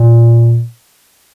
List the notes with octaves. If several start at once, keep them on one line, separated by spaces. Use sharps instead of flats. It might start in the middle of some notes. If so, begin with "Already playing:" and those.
Already playing: A#2